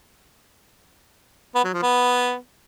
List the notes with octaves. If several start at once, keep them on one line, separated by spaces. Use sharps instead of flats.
B3
F#3
F3
B3